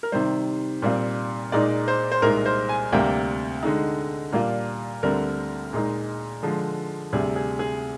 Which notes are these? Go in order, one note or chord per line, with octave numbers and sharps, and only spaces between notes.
A#4
C3 D#3 G3 C5
A#2 G3 C4 F4
A#2 G#3 D#4 D5
C5
C5
C2 A#2 G#3 D#4 A#4
C5
G#5
D2 C3 G3 A#3 G5
D3 G#3 D#4
A#2 G3 A#3 D4 F4
D2 D3 G3 C4 A#4
A#2 G#3 D#4
D3 F3 G#3
D2 C3 G3 G#4
G#4
G#4